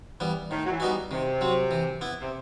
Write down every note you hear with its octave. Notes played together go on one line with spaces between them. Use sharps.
E3 G3 B3
A2 D#3
F#3
E3
G3 B3 D#4 F#4
C3 D#3
F#3 C4
E3
B3 E4
C3